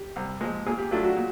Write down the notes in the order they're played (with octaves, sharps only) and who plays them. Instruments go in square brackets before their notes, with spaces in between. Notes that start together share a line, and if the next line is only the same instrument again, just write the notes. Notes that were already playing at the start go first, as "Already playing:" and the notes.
Already playing: [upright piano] G4
[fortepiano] C2
A#2 F3 G#3
[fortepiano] A#2 [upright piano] G#4
[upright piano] G4
[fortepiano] F#3 A3 D4 [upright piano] F4
[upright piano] F#4
[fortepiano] A#2